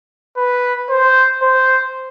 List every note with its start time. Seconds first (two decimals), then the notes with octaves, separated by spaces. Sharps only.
0.37 B4
0.90 C5
1.43 C5